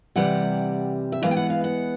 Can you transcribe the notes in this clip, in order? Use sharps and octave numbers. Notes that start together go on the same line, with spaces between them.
C3 E3 G3 F#5
E5
E3 G#3 B3 F5
G5
F#5
F5
F#5